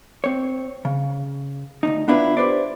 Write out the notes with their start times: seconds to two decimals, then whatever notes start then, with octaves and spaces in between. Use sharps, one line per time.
0.24 C4 C#5
0.85 C#3
1.83 D2 G#2 D#4
2.08 B3 D4 E4 F4 B4
2.37 G4 B4 C5 D5